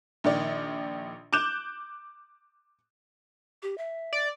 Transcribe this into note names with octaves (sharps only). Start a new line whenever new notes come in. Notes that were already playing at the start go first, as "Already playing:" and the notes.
A#1 D#3 D5
D6 F#6 G6 E7
G4
E5
D5